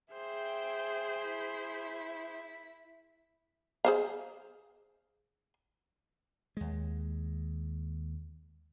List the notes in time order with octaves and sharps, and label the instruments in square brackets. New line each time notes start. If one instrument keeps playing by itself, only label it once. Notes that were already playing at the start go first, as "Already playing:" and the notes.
[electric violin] G#4 C5 [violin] E5 G5
[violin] E4 B6
[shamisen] G#4 C5 F5
[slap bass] D#2 G#3